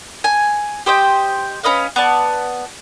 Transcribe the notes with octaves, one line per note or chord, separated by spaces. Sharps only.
G#5
G4 C5 D#5 G5
C#4 B4 D#5 F5
B3 D5 A5